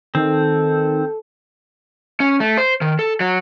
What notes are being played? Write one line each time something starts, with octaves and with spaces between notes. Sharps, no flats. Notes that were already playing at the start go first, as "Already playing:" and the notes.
D#3 C4 A4
C#4
A3
C5
D#3
A4
F#3